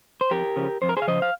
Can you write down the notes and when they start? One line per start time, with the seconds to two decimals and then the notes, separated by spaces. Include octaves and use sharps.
0.21 C5
0.31 F2 G4 A#4
0.56 C#3 F3
0.82 F2 C5
0.89 A#4
0.97 G#4 C5
1.02 F5
1.08 C#3 F3 C5 D#5
1.22 F5